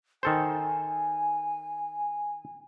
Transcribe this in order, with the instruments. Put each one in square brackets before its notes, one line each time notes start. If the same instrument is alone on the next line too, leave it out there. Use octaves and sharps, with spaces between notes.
[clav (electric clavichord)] D#3 A4 C5 [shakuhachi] G#5